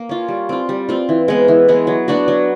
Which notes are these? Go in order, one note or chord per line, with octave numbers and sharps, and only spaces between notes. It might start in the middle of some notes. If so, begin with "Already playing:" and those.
Already playing: A#3
C#4 F4
G3
C4 F4
G3
C4 F4
E3
G#3 B3
E3
G#3 B3
F#3
B3 D4 F#4
F#3